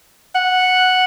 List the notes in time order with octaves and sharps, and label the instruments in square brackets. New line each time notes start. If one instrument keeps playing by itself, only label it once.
[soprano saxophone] F#5